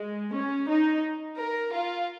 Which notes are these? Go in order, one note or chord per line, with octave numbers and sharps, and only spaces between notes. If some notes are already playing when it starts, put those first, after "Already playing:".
Already playing: G#3
C#4
D#4
A#4
F4